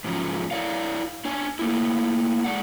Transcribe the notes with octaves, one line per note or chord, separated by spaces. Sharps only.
G#2 C#3 F3 F#3
E4 C#5 D5 F5
D4 C#5 G#5
A3 A#3 E4
G#3 D5 F#5